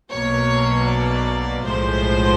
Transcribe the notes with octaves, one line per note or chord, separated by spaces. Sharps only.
B1 B2 F#3 A#3 C#5
D5
B1 A2 F3 G#3 C5